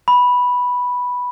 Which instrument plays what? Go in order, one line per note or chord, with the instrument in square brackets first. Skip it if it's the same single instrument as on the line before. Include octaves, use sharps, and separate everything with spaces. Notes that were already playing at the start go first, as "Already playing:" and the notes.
[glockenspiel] B5